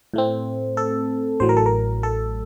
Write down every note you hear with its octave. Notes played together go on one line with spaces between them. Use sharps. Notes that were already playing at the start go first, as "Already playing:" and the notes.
A2 A3 C4
A4
A1 A2 F#3 C5
A#4
A4
A#4
A4